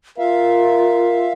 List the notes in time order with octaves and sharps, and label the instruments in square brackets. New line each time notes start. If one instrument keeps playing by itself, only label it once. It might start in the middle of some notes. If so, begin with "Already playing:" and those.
[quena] F4 [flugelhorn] A#4 [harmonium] E5 F5